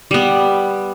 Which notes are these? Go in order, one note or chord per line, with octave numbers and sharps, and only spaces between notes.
G3 B3